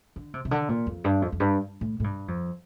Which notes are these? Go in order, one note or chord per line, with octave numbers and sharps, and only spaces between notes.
D3
C3
C3
D3
A#2
F2
G2
F2
F2
G2
A2
A2
G2
F2